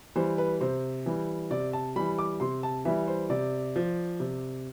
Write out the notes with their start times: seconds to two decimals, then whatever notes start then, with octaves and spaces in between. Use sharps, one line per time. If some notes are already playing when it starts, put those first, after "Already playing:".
0.16 E3 G3 C5
0.38 B4
0.61 C3 C5
1.06 E3 G3
1.51 C3 D5
1.73 A5
1.96 E3 G3 B5
2.18 D6
2.40 C3 C6
2.63 A5
2.85 E3 G3 E5
3.08 C5
3.30 C3 D5
3.76 F3
4.20 C3